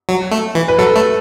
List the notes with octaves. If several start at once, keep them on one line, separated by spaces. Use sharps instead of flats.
F#3
A3
E3
B4
F#3 A4
A3